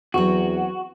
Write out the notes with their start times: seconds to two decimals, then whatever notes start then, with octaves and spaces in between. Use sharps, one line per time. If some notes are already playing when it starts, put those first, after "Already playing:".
0.14 E2 F#3 C4 F#4